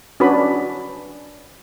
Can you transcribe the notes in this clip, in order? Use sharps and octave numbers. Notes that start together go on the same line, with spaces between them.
C#4 D4 F#4 B4 D5 B5